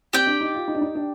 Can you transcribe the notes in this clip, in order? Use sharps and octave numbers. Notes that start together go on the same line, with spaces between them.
C4 G4 D5 G5
D4
D#4
F4
D#4
D4
D#4
D4